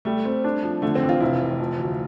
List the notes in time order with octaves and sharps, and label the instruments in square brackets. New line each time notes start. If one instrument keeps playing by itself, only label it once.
[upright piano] G3 [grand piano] A3
[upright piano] C4
D4
F3
[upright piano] D3 [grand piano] A3
[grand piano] C4
[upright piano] A1
[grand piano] F4
[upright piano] F1 [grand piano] E4
[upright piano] E3
F3
D2